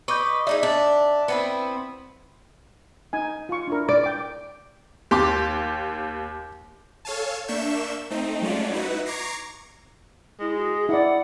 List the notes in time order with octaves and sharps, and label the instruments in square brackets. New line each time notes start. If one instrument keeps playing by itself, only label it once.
[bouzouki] B4 D#5 [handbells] C#6 D6 G6
[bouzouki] D4 D#4 G#4 [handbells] E5
[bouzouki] D4
B3 C4 E4
[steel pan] D#4 G#5
F4 C#6
D4 E4 A#4
[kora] D5 [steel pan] D6
[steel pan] G5 D6
[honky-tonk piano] D#2 [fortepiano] G4 C6 D6
[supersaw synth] A4 C#5 F5 G#5 A5
A#3 D4 E5 C#6 G6 E7
A3 C4 D#4
F#3 G#3 A3 C#4 F4 D5
D#4 E4 F#4 B4
A#5 C#6 D6 G#6 A#6 C7
[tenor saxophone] G#3 [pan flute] E4
[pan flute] F#4
G#4
[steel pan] E4 D5 [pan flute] F#5